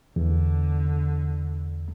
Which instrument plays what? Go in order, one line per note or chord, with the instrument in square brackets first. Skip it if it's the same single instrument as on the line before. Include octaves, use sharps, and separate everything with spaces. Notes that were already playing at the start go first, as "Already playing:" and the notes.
[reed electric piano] E2 [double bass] D3